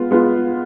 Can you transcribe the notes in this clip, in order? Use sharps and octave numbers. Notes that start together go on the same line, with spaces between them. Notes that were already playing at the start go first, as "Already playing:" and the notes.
Already playing: G#3 B3 F4
G#3 B3 F4